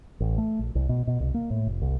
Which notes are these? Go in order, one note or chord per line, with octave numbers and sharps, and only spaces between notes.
A1
A3
A#1
C2
B2
B2
C2
A#3
A2
F1
C2